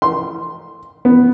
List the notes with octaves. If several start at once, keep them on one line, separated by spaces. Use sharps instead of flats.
C6
B3